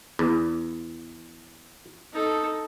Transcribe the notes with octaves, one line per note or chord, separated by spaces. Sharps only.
E2
D#4 A4